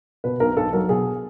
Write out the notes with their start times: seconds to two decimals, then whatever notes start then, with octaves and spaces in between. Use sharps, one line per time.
0.24 B2 B4
0.40 B1 A#4
0.57 B1 A4
0.73 F#3 A#4
0.89 B2 G#4